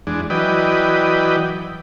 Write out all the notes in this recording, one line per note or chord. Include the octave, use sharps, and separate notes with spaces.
E2 G#3 D4
E3 F#3 B4 D5 D#5 G5